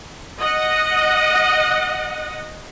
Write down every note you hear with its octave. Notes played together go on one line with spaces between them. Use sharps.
D#5 F#5